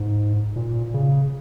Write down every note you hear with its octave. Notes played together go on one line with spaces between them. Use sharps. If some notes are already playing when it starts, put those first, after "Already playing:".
Already playing: G#2
A#2
C#3